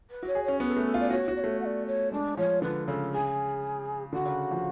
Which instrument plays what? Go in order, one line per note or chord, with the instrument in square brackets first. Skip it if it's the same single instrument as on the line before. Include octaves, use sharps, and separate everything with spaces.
[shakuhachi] B4
[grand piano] F#4 [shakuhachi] C#5
[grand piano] G#4
[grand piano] C#4 [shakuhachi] C#5
[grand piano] B3 [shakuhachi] B4
[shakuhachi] A4
[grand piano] A3 [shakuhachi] B4
[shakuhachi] A4
[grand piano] F4
[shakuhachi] D5
[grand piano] F#4 [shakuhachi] C#5
[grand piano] F#4
[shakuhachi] D5
[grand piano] A3 [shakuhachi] C#5
[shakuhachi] F#5
D5
C#5
[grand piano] G#3 [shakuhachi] D4
[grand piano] F3 [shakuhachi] C#5
[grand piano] D3 [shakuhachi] B4
[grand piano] C#3 [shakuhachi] A4
[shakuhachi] G#4
[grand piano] D3 [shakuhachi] F#4
[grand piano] C#3
F3